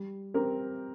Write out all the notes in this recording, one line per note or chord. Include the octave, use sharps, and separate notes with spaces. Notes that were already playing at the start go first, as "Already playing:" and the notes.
Already playing: G3
C4 G4 A#4